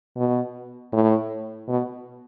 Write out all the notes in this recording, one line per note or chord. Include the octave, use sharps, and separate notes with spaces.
B2
A2
B2